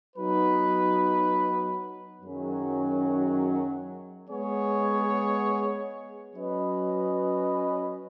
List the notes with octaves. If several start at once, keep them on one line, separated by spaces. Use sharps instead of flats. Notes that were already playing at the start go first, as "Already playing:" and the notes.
F#3 B3 D#4 B4
F#2 D#3 F#3 C#4 G#4
G#3 B3 G#4 C#5
F#3 C#4 B4 D#5